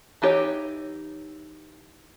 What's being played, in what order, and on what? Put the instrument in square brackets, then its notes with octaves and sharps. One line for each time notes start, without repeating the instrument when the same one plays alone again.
[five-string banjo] E3 D#4 G4 C#5